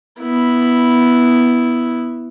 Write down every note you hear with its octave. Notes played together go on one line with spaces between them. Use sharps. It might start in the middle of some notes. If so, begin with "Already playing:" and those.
B3 E4